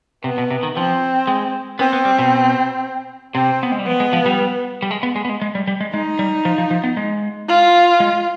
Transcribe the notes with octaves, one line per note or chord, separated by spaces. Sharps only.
C3 B3
B2
C3
D#3
F3 C4
G#3
B3 C4
B3
G3
B2
C3 C4
B3
G#3
G3
F3 B3
G#3
F3
G3
G3
G#3
B3
G#3
B3
G#3
G#3
G3
G3
G#3
G#3 D#4
G3
F3
F3
F3
B3
G#3
F4
G#3